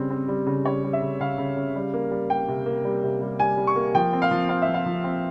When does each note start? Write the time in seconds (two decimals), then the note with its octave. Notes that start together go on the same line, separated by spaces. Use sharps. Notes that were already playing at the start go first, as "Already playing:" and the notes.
Already playing: C#3 G3 C4
0.11 C4
0.28 G3
0.47 C#3
0.65 G3 C#5
0.84 G3
0.93 E5
1.02 C#3
1.20 C#3 F5
1.38 C#3
1.57 C#3
1.76 G3
1.94 A#3
2.11 G3
2.30 G3 G5
2.48 C3
2.66 A#3
2.85 G3
3.03 C3
3.21 G3
3.40 G3 G#5
3.57 G3
3.67 C#6
3.76 A#3
3.95 F3 G5
4.13 C4
4.22 F5
4.31 F3
4.49 C4 F5
4.62 E5
4.67 F3
4.74 F5
4.86 F3
5.04 C4